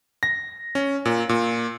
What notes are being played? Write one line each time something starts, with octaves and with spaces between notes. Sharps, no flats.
A#6
C#4
A#2
A#2